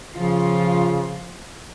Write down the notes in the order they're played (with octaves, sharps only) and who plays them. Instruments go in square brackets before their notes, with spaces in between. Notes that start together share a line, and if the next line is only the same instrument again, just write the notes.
[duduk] C#3 [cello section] F3 F4